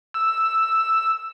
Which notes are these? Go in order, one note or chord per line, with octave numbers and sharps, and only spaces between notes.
E6